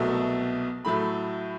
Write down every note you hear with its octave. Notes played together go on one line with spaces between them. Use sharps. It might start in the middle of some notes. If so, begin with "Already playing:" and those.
Already playing: C2 B2 F#3 A3
A2 F#3 A3 B5